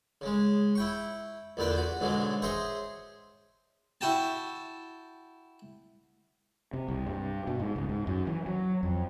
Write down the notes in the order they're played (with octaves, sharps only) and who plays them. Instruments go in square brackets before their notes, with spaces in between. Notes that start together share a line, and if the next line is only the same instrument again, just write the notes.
[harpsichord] C#3 G#3
E4 G5 C#6
E2 A#2 D3 D4 B4 G5
F#4
G#2 B2 D3 F#3 G#3
G#4 C5 C#5 D#5 E5
E4 F#4 G5 A5
[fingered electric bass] C3
C2
G2
B2
G#2
C#2
G#2
F#2
E3
F#3
F2